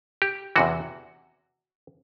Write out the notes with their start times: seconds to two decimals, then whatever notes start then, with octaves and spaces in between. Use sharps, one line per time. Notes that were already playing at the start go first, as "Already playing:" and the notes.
0.22 G4
0.56 E2 C3 E3 F#4